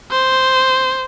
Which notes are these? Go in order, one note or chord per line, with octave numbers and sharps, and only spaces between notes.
C5